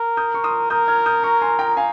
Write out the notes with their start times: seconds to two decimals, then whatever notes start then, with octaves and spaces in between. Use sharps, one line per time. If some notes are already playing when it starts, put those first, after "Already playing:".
Already playing: A#4
0.17 D#6 G6
0.34 C#6
0.44 C6 D#6
0.70 A#4 D#6 G6
0.88 F6 G#6
1.06 D#6 G6
1.23 A#5 C#6
1.42 G#5 C6
1.59 G5 A#5
1.77 F5 G#5